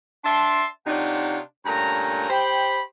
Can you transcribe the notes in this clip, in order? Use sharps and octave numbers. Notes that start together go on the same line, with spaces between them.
D4 E5 A5 C6
C3 D4 D#4 F4 C#5 F#5
G2 A#2 A3 C#4 A#5
G4 C5 G5 B5